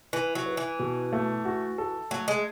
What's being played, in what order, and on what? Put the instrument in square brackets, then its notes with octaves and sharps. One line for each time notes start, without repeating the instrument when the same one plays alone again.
[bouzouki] E3 [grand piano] E4
[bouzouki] F#3
[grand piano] B4
[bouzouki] E3
[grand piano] B2
A3
F#4
A4
[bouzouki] F#3 [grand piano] A3
[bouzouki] G#3